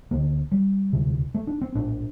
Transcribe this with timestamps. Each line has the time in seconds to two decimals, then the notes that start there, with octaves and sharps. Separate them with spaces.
0.11 D2 D3 A#3
0.52 G3
0.93 E1 D2 C3
1.34 A3
1.47 D4
1.61 C4
1.75 A#1 A2 D4